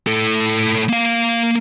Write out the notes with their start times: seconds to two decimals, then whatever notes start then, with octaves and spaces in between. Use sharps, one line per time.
0.07 A2 A4
0.89 A#3 F5